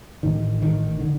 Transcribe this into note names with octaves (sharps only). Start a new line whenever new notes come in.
A1 A2 D#3
D#3
D3